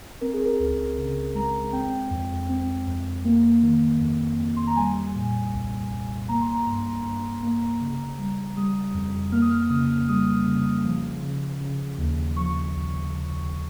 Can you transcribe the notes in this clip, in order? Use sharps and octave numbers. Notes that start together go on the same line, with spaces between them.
C4 A#4
G#4
A#4
C#2
C#3
G#3 A#5
C4 G5
F2
C4
F2
A#3
D#3
F2
F2
C6
A#5
G3 G#5
A#2
C2
C2
A#3 A#5
C6
A#5
G2
G2
A#3
C#3
G3
G3 D#6
F2
A#3 F6
D#6
F6
C#3 D#6
G3 D#6
C#3
F3
C#3
C#3
D#2
F3 C#6
C2
C2